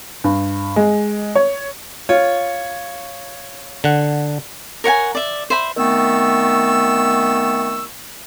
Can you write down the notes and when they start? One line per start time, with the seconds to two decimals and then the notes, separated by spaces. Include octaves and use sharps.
0.24 G2
0.76 G#3
1.35 C#5
2.09 F4 C#5
3.84 D3 F#5
4.84 A#4 C#5 F#5 G#5
5.15 D5 E5
5.50 C5 E5 B5
5.77 D#3 A3 B3 C4 C#6 E6